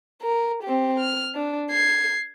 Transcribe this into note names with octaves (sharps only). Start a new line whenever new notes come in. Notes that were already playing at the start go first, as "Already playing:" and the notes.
A#4
C4 G4
F6
D4
G#6 C7